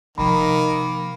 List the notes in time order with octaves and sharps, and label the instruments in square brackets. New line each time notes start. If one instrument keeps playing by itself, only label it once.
[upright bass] C3 F3 [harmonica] D#3 [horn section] A#3 [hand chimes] B5